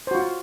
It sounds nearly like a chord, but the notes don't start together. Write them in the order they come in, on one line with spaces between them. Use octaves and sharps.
C5 F#4 F4